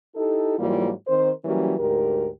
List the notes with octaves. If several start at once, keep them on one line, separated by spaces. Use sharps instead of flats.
D#4 E4 G4 A4
G#2 E3 F#3 G3 A#3 F4
D#3 C4 A#4 C5
E3 F#3 G3 A#3 C#4
D2 G#2 G4 A#4